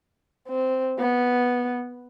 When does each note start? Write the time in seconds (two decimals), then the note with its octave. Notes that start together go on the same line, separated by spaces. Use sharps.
0.48 C4
0.99 B3